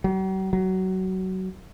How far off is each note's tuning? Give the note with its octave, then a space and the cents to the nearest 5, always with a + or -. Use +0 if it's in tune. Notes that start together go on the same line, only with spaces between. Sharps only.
F#3 +45
F#3 +20